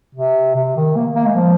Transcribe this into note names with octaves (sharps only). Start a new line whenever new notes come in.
C3
C3
D#3
A#3
A#3
G#3
F3